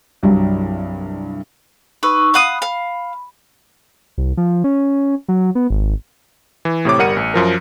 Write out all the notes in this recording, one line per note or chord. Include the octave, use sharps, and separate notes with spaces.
C2 G2 F#3
D#4 B4 C#6 E6
F5 F#5 B5 D#6
F5
C2
F3
C#4
F#3
B3
G#1
E3
A2 C3 C#5 D6
G1 G3 A#4 F#5 C#7 D#7
A1
F#2 F3 A#4